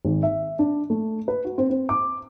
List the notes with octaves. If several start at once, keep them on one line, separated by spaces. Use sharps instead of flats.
G#1
E5
D4
A3
B4
F#4
C4
C4
D6